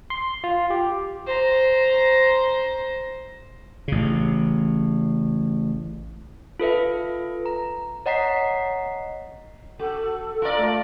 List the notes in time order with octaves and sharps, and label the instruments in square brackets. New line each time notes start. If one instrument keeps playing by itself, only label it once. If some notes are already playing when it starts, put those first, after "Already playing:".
[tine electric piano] C6
F4
G4
[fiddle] C5 A#5
[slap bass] A1 C#3
[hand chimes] F4 A4 B4 E5
A#5
C#5 D#5 F#5 A#5 B6 C7
[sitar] F#4 [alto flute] A4
[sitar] F4 A#4 D5
[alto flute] A3